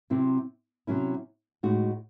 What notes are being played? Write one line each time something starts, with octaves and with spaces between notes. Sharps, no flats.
C3 F#3 C4 E4
C3 F#3 C#4 E4
A2 G#3 D#4 F#4